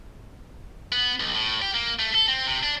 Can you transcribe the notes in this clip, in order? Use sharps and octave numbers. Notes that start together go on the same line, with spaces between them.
B3
B1
A2
G4
A#3
A3
A4
C4
C3
D4